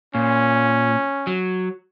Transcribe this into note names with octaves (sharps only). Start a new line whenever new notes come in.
A#2 C#4
F#3